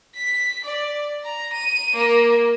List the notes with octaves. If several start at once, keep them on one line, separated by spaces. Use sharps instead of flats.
B6
D5
A#5
D#7
A#3